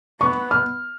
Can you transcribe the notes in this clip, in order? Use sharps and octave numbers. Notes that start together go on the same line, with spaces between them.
B3 C#6
F6